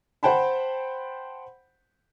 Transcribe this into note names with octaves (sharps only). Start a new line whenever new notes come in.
C5 F#5 G5 A5 B5